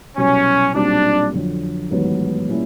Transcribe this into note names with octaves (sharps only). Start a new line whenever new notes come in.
C2 B2 F#3 C#4
B1 A#2 G3 C4 D4
F2 D3 F#3
A1 G#2 D#3 F#3 B3
A#2 G3 A#3 C#4 E4